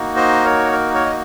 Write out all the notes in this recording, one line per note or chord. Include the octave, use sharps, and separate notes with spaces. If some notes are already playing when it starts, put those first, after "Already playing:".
Already playing: A#3 D#4 F#4
C5 D#5
A#4 C#5
A#4
A#4 C#5
D#5